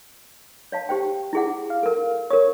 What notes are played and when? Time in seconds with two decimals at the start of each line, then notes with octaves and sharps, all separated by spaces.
0.72 C#5 F5 A5
0.89 G4 C5 G5
1.33 E4 G#4 F#5
1.70 F5
1.83 A4 A#4
2.30 A#4 C#5 D#6